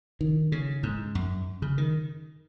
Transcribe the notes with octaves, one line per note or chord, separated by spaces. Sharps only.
D#3
C#3
G#2
F#2
C#3
D#3